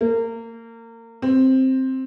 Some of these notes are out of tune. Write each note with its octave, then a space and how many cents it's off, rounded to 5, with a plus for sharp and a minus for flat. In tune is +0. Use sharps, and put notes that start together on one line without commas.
A#3 -30
C4 +5